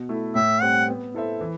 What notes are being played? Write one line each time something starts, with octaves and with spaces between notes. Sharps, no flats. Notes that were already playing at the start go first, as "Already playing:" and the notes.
Already playing: B2
A3 E4
A2 E5
G3 C4 F#5
B3
E4 A4 C5 E5
E3